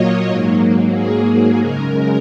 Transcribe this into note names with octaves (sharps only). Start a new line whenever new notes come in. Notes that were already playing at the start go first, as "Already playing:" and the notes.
Already playing: A#2 F#3 A#3 C#5 D#5
G#2 F#3 A#3
G#4
F#2 C#3 G#3 A#4